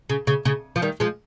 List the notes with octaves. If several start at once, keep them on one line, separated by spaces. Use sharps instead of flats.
C#3
C#3
C#3
F3
D#3 G3
F3 G#3